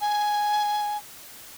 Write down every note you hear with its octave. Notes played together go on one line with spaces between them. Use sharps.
G#5